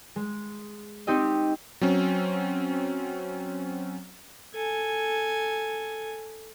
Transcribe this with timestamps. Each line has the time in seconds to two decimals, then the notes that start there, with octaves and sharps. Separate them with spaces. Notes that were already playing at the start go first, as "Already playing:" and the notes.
0.16 G#3
1.07 C4 D#4 G4 D#5
1.81 F#3 C4 C#4
4.54 A4 G#5